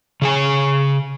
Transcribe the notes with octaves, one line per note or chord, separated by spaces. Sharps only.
C#3 G#4 G#5